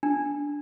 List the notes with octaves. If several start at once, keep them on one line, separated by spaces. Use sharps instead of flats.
D4